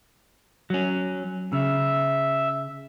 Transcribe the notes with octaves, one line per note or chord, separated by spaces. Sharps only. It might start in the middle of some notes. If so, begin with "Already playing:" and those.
F#3 C#4
C#3 E5